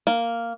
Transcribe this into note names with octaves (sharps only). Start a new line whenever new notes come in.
A#3